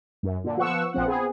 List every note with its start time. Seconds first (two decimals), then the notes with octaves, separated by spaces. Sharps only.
0.23 F#2
0.44 A#2 D3
0.57 F3 B3 F#5 C#6 E6
0.93 A#1 F3 C4 F#5
1.05 B3 C4 G#4